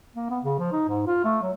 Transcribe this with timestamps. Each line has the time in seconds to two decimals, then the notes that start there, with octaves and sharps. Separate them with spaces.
0.16 A#3
0.30 B3
0.43 C#3
0.59 F3
0.72 D#4
0.88 G#2
1.07 F4
1.24 A3
1.43 F#3